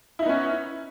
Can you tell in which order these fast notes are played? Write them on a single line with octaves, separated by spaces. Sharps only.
E4 D#4 B3 C#4